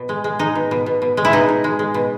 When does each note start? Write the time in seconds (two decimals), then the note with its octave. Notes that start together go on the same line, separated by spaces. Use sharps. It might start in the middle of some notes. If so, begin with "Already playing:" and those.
Already playing: B2
0.09 G#3
0.24 G#3
0.39 G#3 D#4
0.55 B2
0.71 B2
0.86 B2
1.02 B2
1.17 G#3
1.25 E4
1.33 B2 D#4
1.49 B2
1.64 G#3
1.79 G#3
1.94 B2